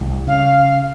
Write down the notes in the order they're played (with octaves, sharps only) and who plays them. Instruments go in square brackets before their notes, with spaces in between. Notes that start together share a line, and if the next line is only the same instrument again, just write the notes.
[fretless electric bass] C2
[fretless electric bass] C#3 [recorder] F5